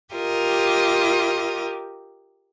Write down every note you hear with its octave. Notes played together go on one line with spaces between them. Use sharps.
F4 G4 A#4 D#5